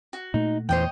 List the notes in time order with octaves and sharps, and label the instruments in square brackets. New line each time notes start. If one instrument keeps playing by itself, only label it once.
[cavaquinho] F#4
[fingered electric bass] A#2 A3 [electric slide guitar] D#4
[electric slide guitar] E2 C5 [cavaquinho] C#5 D#5 G5